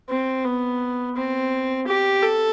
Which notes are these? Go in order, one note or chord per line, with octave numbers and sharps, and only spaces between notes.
C4
B3
C4
G4
A4